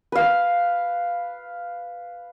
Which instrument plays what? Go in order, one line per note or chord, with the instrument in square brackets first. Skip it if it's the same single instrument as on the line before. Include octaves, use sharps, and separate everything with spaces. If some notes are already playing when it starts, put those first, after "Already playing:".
[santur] B4 F5